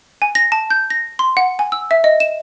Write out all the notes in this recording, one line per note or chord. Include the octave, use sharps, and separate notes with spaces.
G#5
A#6
A5
G6
A#6
C6
F#5
G#5
E6
E5
D#5
E7